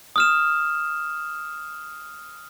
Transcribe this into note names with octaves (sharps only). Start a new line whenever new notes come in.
D#6 F6 E7